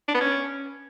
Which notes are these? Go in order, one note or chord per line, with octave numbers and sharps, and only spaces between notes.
D4
B3
C#4